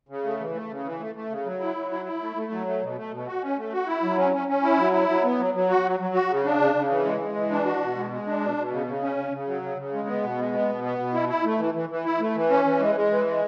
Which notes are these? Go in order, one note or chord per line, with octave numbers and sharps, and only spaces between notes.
C#3
A3
E3
A3
C#3
E3
A3
A3
C#3
F#3
E4
F#3
E4
E4
A3
A3
F#3
A3
B2
A3
B2
F#4
C#4
A3
F#4
E4
F#3
C#4
C#4
C#4
E4
F#3
E4
F#3
B3
F#3
F#3
F#4
F#3
F#3
F#4
C#3
D4
C#3
C#3
E3
G#3
G#3
E3
D4
F#4
B2
G#3
G#3
D4
B2
B2
C#3
C#3
C#4
C#3
C#3
F#3
C#3
C#3
G#3
B3
B2
G#3
B3
B2
B3
B2
E4
E4
A3
E3
E3
E3
E4
A3
E3
C#4
E3
G#3
G#3
E3
G#3